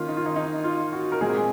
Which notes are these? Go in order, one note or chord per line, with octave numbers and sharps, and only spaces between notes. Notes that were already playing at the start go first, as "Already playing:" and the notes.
Already playing: D#3 A#3 C#4 F4
D#4
F4
D#4
D#4
F4
F#4
A#4
A#2 G#3 C4 G#4